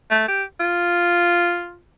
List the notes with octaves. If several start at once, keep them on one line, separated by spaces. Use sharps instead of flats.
A3
G4
F4